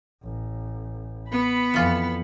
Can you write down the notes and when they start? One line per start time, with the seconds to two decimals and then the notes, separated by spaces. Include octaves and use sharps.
0.23 A1
1.32 B3 B5
1.74 F2 E3 F4